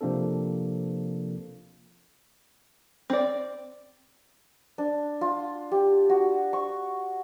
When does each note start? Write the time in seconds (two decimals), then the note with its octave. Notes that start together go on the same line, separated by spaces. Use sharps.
0.01 C3 F3 A#3 C4 D4 A4
3.10 C4 D5
4.78 D4
5.21 F4
5.72 G4
6.09 F#4
6.53 C#6